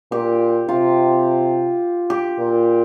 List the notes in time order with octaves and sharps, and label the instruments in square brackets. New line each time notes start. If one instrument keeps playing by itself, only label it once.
[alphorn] A#2 [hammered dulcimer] G4
[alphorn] C3 [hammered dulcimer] F4
[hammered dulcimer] G4
[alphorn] A#2